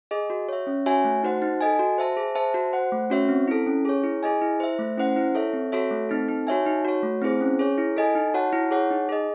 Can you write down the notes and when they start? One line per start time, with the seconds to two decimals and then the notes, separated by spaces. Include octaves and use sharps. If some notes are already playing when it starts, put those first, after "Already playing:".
0.11 G#4 D#5
0.30 F#4
0.49 C#5 E5
0.67 C#4
0.86 F#4 C#5 E5 G#5
1.04 A3
1.23 D#4 F#4 C5 F#5
1.42 D#4
1.61 A4 D#5 G#5
1.79 F#4
1.98 C5 E5 A5
2.17 G#4
2.35 C5 E5 A5
2.54 F#4
2.73 C5 F#5
2.92 A3
3.10 C#4 F#4 C#5 E5
3.29 C4
3.48 E4 A4
3.67 C#4
3.85 G#4 C#5
4.04 E4
4.23 G#4 D#5 G#5
4.42 E4
4.60 C5 E5
4.79 A3
4.97 C#4 E4 C5 F#5
5.16 E4
5.35 A4 C#5 E5
5.53 C4
5.72 F#4 A4 C#5 E5
5.91 A3
6.09 C4 D#4 A4
6.28 D#4
6.47 F#4 C#5 E5 G#5
6.66 D#4
6.85 F#4 C#5
7.03 A3
7.22 C4 E4 G#4 C5
7.41 C#4
7.59 G#4 C#5
7.78 E4
7.97 A4 D#5 G#5
8.15 D#4
8.34 F#4 C#5 F#5 A5
8.52 E4
8.71 G#4 C#5 F#5
8.91 D#4
9.09 G#4 D#5